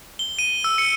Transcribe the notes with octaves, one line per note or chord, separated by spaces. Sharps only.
G7
D#7
E6
C#7